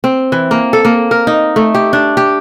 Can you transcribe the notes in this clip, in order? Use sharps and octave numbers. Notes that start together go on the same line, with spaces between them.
C4
E3
A#3
A4
A#3
A#4
D#4
A3
G4
D4
G4